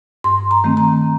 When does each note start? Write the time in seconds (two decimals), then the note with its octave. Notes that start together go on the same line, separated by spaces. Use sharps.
0.24 G2 C6
0.51 A#5
0.64 D#3 A3 C4
0.77 A#5